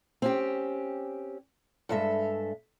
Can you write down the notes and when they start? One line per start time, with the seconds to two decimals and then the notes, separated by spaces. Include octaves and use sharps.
0.22 C4 C#4 G4
1.89 G2 G#3 A4 E5